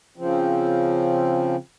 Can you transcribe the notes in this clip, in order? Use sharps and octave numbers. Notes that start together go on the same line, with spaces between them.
C#3 F3 C4